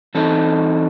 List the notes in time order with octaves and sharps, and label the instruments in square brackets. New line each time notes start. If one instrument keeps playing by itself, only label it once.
[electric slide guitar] E3 C4 D#4 A4